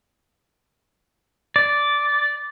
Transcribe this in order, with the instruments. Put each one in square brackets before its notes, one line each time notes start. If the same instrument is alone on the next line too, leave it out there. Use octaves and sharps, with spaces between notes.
[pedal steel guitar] D5